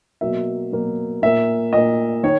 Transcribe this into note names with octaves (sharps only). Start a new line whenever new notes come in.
B2 F#3 A#3 E5
B2 F#3 A#3
A#2 A#3 E5
A#2 A#3 D#5
D#3 C#5